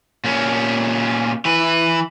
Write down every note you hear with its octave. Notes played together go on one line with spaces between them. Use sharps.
A#2 C#4
E3 B4